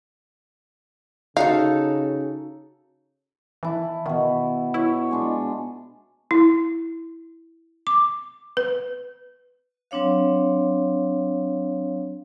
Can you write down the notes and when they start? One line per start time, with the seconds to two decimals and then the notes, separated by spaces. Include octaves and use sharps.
1.37 C#3 D#4 F#4 A4 F5
3.63 E3 E4 A5
4.06 B2 D#3 F#4
4.74 E4 B4 C#5
5.11 G#3 D4 F4
6.31 E4
7.87 D6
8.57 B4
9.91 F#3 C4 D4 C#5 F5